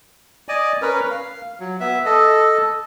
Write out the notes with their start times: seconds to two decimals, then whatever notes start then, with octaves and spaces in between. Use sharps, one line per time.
0.49 D5 D#5 G#5
0.82 C#4 A#4 B4
1.11 F5
1.60 F#3
1.80 B3 E5
2.06 A4 D#5